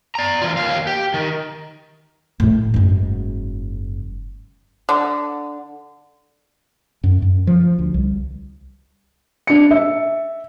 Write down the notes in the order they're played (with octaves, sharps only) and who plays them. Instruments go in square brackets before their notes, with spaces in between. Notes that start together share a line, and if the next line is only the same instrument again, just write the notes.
[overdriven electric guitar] D5 A#5
E3 F4
D#2 F5
G4
D#3
[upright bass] A2 A3
F#1 G#2
[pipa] D3
[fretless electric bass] F#2
F#2
F3
D2
C2
[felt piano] D4 C#7
E5